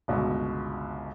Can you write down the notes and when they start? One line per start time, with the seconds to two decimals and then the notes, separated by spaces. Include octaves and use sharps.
0.08 G1 C#2 B2